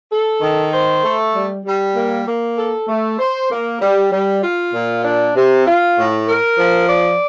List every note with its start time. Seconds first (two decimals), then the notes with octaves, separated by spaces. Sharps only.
0.11 A4
0.41 D#3
0.72 C5
1.04 A3
1.35 G3
1.65 G3
1.95 A#3
2.26 A#3
2.57 A4
2.88 A3
3.19 C5
3.51 A#3
3.80 G3
4.11 G3
4.42 F4
4.73 A#2
5.04 D4
5.35 C3
5.66 F4
5.97 A2
6.28 A#4
6.58 F3
6.89 D5